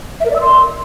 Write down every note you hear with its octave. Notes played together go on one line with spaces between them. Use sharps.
E5
A#4
D5
E6
C6